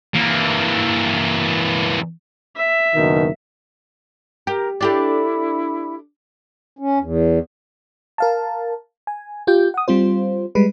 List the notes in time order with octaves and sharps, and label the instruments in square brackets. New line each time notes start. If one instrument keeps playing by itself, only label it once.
[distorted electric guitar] E3 A#3
[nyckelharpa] E5
[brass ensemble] F#1 B2 D#3
[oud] G4 [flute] A#4
[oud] D4 G4 A4 [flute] E4
[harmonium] C#4
E2
[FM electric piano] A#4 F5 A5
G#5
F4 G4 G5 G6
F#5 D#6
G3 C4 F4 C5
G3 G#3 B4